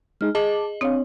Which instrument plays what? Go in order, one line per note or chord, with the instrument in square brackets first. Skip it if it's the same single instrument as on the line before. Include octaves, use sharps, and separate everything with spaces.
[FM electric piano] G#3 D#4 G#4 [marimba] F6
[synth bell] G#4 D#5 [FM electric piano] A5 D6
[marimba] C4 D4 C#5 [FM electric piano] F5 D#6